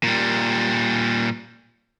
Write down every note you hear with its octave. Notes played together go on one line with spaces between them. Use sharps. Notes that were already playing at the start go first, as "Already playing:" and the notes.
A#2 G3